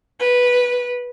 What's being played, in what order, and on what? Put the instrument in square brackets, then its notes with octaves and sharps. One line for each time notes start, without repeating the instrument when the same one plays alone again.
[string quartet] B4